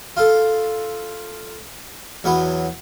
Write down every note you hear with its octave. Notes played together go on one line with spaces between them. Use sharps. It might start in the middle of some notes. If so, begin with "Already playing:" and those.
F4 A4
E2 F#3 B3 B4